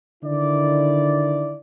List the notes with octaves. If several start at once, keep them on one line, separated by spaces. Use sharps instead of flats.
D3 D#3 E4 D5